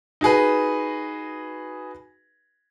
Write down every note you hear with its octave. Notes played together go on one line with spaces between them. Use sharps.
D#4 F#4 G#4 B4